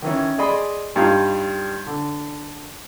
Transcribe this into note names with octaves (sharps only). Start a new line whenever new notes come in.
D#3 E3 C#4
G#4 D5 D#5 B5 C6
G2 G3 D#4 F4
D3